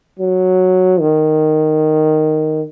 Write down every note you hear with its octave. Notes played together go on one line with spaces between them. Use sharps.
F#3
D#3